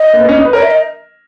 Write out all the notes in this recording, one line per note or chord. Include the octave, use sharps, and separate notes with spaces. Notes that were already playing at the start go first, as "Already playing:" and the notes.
Already playing: D#5
A#3
B3
C#4
D#4
B4
A#4 C#5
E5
D#5